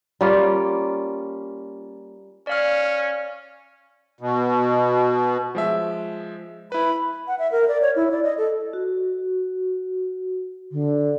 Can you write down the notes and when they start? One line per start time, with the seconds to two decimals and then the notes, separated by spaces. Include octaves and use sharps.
0.21 G3 A#3 C#4 F4
2.47 C#4 D5 F5 F6
4.21 B2
5.55 F3 G#3 E5
6.72 E4 B4 B5
7.28 F#5
7.39 E5
7.52 A#4
7.68 D5
7.82 C#5
7.96 E4
8.11 D5
8.24 D#5
8.38 A4
8.73 F#4
10.71 D3